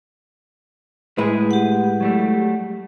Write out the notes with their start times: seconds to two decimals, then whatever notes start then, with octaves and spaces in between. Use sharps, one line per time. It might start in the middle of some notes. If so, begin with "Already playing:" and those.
1.18 A2 G#3 E4 G#4 B4
1.51 G4 F#5
2.00 F#3 G3 A3